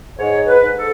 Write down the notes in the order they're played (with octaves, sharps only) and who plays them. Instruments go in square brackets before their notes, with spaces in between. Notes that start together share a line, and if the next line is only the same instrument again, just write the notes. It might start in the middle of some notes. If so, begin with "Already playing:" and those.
[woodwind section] G#2 C#5
B4
G#2
A4